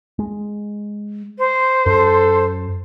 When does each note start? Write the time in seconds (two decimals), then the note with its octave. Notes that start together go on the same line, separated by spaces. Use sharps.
0.19 G#3
1.39 C5
1.86 F#2 A4